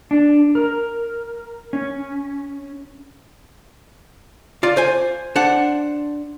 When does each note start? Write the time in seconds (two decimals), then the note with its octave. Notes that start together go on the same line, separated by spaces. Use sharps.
0.11 D4
0.55 A#4
1.73 C#4
4.63 F4 D5
4.77 C5 G#5
5.36 D4 C5 F#5